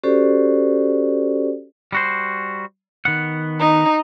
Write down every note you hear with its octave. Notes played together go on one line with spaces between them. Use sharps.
C#4 F#4 G4 A4 C5 D5
G3 F#4 C5
D#3 B3 F#5
D#4